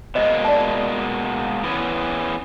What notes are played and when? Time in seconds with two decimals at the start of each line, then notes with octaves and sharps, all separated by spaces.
0.15 B2 G#3 A#3 C5 D#5
0.45 D5 A5
1.64 E3 B3 C#4